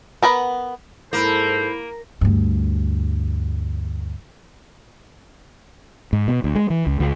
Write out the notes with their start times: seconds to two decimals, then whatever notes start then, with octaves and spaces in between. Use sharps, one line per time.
0.22 B3 A#4 B4 F#5
1.13 G#2 A#3 E4 A4 C5 B5
2.21 D2 G2
6.13 G#2
6.28 B2
6.44 D2
6.56 G#3
6.70 E3
6.87 C#2
7.00 C#2